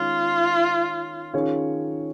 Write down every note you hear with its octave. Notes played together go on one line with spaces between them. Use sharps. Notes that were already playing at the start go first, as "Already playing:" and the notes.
Already playing: D#3 G#3 C#4 F4
D#3 C#4 F4 G#4 C#5